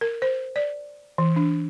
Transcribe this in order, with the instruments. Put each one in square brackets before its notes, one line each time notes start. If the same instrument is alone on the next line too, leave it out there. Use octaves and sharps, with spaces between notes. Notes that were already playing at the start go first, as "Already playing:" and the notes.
[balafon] A#4
C5
D5
E3
D4